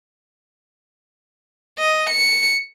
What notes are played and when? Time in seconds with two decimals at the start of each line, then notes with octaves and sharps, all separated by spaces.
1.79 D#5
2.10 C#7